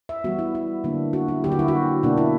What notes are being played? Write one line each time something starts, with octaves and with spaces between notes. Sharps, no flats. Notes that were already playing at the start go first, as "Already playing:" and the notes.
E5
E3 G3 B3 F#4
E4
E4
D3 F#3 A#3 D4
F#4
E4
D3 F#3 A#3 G4
F#4
E4
F#4
B2 A#3 D4
E4